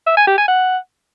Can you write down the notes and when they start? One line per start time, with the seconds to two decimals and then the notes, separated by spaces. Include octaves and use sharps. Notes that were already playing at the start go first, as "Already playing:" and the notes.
0.07 E5
0.17 G#5
0.27 G4
0.38 G#5
0.48 F#5